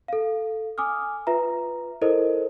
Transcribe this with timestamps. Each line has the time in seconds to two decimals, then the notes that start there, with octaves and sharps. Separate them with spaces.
0.08 A4 F5
0.78 G#5 D6 D#6 F6
1.27 F4 B4 E5 A#5
2.01 E4 A4 A#4 C5 D#5